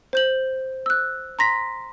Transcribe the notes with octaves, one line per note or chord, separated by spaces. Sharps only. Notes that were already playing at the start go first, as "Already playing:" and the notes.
C5 G6 F#7
E6 F#6
A#5 C6 A#6 B6